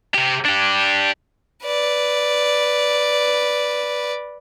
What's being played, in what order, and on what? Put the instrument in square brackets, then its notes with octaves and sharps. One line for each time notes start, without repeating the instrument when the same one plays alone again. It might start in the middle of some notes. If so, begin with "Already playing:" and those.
[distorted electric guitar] C3 G4
D4 G4
[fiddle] B4 D5